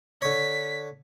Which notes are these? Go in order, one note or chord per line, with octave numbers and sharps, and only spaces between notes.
D3 C#5 B6